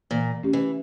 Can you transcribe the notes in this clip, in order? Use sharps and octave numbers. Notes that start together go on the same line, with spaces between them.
A#2 E3
A3 C#4 G4
E3